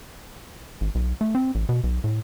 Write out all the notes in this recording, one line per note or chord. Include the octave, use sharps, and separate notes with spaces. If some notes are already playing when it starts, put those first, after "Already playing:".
G#1
B1
A3
C4
A1
B2
B1
A2